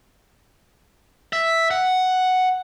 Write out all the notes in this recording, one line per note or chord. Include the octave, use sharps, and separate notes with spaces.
E5
F#5